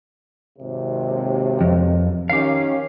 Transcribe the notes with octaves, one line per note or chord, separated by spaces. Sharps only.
G#1 D#2 C3
F2
D#3 C#4 G4 F5